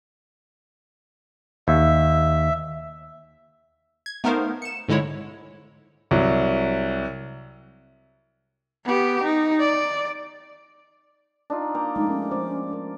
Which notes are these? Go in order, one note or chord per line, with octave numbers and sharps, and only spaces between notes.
D#2 E5
G#6
A3 B3 D#4 A#4 C5 F5
C#7 E7
G#2 D3 G#3 E4 C#5
C2 F#3
B3 G4
D#4
D5
D4 D#4 F4
A#3 G5 A#5
F3 G#3 A3 D#4
B3 C#4 A#4
F3 G#3 C5 D5
A#4